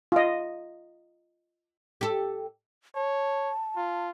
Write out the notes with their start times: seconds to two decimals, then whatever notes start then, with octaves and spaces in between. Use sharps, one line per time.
0.12 F4 D#5
2.01 G4 A4
2.95 C#5 A5
3.76 F4